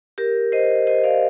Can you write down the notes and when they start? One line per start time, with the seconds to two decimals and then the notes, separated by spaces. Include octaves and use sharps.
0.18 G4 A#4
0.52 C5 D#5
0.87 C5 D#5
1.04 D5 F5